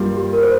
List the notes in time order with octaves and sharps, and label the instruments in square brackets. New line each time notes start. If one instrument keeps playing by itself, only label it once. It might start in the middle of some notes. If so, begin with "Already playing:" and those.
Already playing: [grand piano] G2 G3 A#3 F4
[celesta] G4
A#4
C5